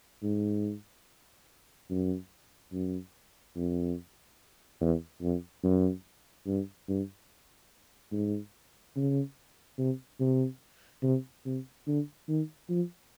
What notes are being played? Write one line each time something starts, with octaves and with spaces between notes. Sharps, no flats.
G#2
F#2
F#2
F2
E2
F2
F#2
G2
G2
G#2
C#3
C3
C3
C3
C3
D3
D#3
F3